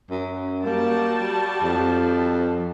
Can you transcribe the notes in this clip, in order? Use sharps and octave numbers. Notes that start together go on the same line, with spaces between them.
F#2
G3 A#3 F#4 A5
F2